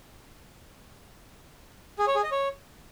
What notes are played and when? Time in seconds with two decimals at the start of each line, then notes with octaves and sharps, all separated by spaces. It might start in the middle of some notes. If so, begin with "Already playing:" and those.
1.99 G#4
2.07 C#5
2.15 G#4
2.23 D#5
2.32 C#5